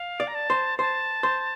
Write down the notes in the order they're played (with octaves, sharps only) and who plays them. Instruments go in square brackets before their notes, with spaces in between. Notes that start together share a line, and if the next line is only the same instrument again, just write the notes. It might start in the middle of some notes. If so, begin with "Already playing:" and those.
Already playing: [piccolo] F5
[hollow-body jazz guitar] D5
[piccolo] A#5
A5
[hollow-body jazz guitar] C5
[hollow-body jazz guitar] C5 [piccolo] A5
[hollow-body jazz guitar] C5